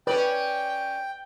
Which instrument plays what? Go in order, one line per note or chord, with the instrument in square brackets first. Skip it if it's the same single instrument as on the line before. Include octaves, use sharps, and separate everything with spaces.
[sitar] C#4 D5 [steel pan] B4 [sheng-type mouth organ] G5